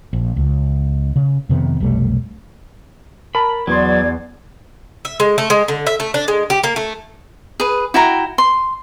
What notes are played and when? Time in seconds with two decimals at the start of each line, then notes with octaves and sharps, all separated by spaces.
0.13 A#1
0.36 C#2
1.16 C#3
1.49 F2 C3 D#3 B3
1.80 F1 B1 G3 A3
3.35 A#4 A5 B5
3.67 E2 F#3 B3 D5 C6 G#6
5.05 E5
5.20 G#3
5.38 A3
5.50 G#3
5.68 D3
5.87 E5
6.00 A3
6.14 D4
6.28 G#3
6.50 G4
6.64 A#3
6.76 A3
7.60 G#4 B4
7.94 E4 F#4 G5 A#5
8.38 C6